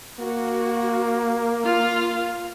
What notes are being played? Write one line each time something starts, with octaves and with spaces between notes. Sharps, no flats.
A#3 F#4
F4 F5